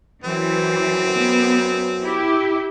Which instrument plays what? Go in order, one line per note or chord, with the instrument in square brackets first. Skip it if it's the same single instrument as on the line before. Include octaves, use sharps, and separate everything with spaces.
[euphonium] F#2 [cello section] E3 [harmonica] C4
[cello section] B3
E4 G4